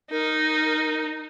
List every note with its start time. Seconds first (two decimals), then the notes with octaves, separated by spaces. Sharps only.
0.11 D#4 A#4